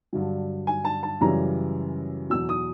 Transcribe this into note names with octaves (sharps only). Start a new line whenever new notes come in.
G2 D3 F#3
G#5
A5
A5
F#2 C#3 E3 G3 A#5
E2 B2 F#3 E6
D#6